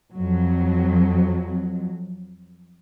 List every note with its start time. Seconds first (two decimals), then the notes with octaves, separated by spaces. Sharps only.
0.14 F2 F#3